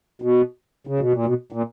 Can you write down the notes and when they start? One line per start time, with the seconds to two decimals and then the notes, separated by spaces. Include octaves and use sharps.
0.22 B2
0.87 C#3
1.00 B2
1.13 A#2
1.26 B2
1.52 A#2